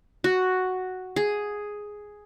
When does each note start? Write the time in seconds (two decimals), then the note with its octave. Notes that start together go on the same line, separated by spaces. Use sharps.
0.24 F#4
1.16 G#4